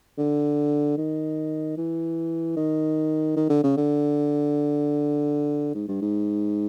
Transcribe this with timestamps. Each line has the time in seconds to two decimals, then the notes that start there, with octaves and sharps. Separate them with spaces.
0.18 D3
0.97 D#3
1.77 E3
2.57 D#3
3.36 D#3
3.49 D3
3.64 C#3
3.77 D3
5.75 G#2
5.88 G2
6.01 G#2